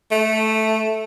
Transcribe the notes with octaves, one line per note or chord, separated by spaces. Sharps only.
A3